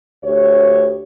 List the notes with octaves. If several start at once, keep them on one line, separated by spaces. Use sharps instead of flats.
D2 G4 C#5